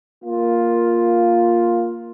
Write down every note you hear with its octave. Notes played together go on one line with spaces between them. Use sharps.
A#3 F4